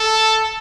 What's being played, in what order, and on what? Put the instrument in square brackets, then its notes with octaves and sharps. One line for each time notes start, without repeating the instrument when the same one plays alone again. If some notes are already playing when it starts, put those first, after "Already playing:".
Already playing: [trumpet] A4